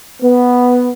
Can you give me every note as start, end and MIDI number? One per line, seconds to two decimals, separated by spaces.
0.22 0.89 59